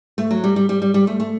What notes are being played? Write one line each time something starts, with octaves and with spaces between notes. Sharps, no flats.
A3
F#3
G3
G3
G3
G3
G3
A3
A3